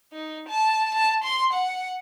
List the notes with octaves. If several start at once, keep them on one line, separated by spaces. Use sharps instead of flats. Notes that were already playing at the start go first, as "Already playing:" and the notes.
D#4
A5
A5
C6
F#5